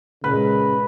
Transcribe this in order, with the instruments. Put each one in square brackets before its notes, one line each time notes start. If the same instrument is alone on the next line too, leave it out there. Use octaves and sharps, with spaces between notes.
[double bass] A#2 G#3 [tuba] C#3 [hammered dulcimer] B4